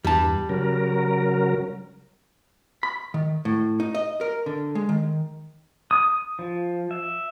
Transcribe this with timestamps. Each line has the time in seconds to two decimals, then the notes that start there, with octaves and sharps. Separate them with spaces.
0.05 E2 G2 G3 A5
0.49 C#3 F#3 A#4
2.83 B5
3.14 D#3
3.45 A2
3.80 D#4
3.95 D#5
4.21 A#4
4.46 D3
4.75 G#3
4.89 D#3
5.91 D#6
6.39 F3
6.91 E5